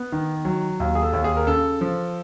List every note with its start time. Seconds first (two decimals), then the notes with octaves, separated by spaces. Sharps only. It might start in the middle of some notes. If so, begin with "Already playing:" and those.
Already playing: B3
0.12 D#3
0.45 F#3
0.80 D#2
0.95 G#4
1.02 A4
1.13 D#2
1.24 G#4
1.37 A#4
1.47 C#3 A4
1.81 F3